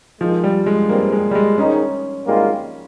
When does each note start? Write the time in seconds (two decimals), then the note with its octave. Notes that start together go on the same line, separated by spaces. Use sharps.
0.21 D#2 D#3 F3 G#3
0.44 G3
0.66 G#3
0.89 G2 G3 A#3 C4
1.12 G#3
1.31 G3
1.35 G#3
1.58 G#2 D#3 G#3 C#4 D#4
2.27 G#1 G#2 G3 A#3 F4